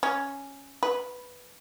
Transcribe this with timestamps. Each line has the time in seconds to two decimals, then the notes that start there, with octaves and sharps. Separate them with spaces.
0.03 C#4
0.83 B4